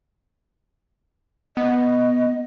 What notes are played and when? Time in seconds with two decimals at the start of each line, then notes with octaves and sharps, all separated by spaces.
1.57 B3 D#5